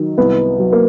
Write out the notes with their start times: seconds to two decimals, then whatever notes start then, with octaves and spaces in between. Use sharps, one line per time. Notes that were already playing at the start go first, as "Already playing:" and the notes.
Already playing: D#3 F#3
0.18 C2 B3
0.59 F#3
0.72 A#3